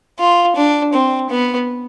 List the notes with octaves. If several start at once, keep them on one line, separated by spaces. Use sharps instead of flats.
F4
D4
C4
B3